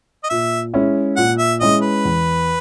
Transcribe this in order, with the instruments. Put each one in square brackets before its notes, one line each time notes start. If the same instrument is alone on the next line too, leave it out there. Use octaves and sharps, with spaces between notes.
[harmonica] D#5
[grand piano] A#2 [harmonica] E5
[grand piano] G#3 C#4 E4
[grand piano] A#2 [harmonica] F#5
[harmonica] E5
[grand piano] G#3 C#4 E4 [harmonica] D#5
[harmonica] B4
[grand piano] E2